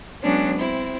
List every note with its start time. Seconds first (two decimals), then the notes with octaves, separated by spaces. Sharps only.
0.24 F#3 G#3 B3 C#4 D4
0.58 C4 E4